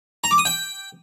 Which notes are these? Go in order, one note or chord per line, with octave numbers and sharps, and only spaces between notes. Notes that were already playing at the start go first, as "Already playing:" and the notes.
A#5
D6
D#6
G5